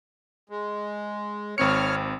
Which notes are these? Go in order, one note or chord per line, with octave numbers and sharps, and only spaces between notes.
G#3
G#1 C4 C#5 F6 C#7